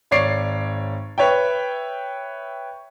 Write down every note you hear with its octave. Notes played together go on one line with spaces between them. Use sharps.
G#1 C#5 D5 C7 D7
B4 C#5 E5 G5